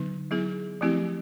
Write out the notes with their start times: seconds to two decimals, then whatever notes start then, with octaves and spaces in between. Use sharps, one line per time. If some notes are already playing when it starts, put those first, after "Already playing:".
Already playing: D3 F#3 B3 D#4
0.31 F#3 B3 E4 G#4
0.81 F3 A3 C4 E4 G4